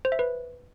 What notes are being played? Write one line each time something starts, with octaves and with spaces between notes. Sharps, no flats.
C5
E5
B4